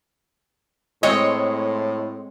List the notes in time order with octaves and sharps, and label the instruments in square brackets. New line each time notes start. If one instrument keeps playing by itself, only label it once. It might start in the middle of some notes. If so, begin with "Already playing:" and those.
[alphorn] A2 [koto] G#3 C4 C#5 [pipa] D#5